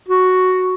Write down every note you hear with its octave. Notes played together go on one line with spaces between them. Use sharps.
F#4